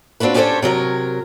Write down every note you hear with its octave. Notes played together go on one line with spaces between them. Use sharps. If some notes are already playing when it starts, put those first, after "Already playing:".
C4 D4 F4 F#4 B4
C#4 D4 G4 A4 C5 C#5
C3 F#3 A#4 C#5